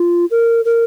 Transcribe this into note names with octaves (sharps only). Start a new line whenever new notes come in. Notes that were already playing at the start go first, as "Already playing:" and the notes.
Already playing: F4
A#4
A#4